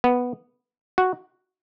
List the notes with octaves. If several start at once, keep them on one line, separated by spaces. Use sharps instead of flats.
B3
F#4